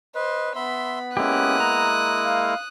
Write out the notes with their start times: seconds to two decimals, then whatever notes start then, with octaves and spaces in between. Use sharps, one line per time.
0.15 B4 C5 D#5
0.56 B3 E5 B5 C6
1.17 G#3 A#3 C#4 E4 G4 D#6 F#6
1.60 A#5
2.24 F5